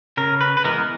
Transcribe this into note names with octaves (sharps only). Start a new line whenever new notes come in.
C#3 A#4
B4
B4
E3 G#3 B3 A#4